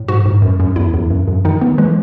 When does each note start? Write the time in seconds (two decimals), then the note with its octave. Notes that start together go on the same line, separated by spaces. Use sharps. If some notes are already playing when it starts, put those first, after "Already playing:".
Already playing: A2
0.08 G#2 F#4
0.26 G#2
0.42 F#2
0.60 F#2
0.76 E2 E4
0.94 E2
1.10 F#2
1.28 F#2
1.45 D#3 D#4
1.61 D#3 B3
1.78 E3 G#3